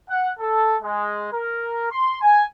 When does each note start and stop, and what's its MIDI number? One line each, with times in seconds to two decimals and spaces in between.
0.10 0.31 78
0.39 0.77 69
0.83 1.31 56
1.33 1.87 70
1.91 2.16 84
2.22 2.44 80